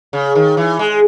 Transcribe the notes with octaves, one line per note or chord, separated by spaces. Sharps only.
C#3
D#3
E3
G#3